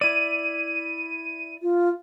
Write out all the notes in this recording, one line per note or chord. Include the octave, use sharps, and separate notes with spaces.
E4 D5 D#7
F4